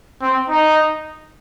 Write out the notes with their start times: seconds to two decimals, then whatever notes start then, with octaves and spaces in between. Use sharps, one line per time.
0.21 C4
0.50 D#4